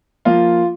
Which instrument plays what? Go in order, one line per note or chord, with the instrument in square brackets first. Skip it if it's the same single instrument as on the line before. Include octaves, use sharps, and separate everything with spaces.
[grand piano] F3 A#3 F4